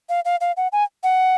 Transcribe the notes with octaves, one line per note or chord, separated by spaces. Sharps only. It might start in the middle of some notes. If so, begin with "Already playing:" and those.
F5
F5
F5
F#5
G#5
F#5